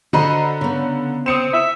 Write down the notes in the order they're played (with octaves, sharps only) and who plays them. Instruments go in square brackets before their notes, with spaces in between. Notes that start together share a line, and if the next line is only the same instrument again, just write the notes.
[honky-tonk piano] D3 A#5 B5 [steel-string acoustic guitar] F#4 C5 D#5
[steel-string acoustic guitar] C#3 B3
[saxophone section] C4 [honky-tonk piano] D#6 C#7 E7
[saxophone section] E5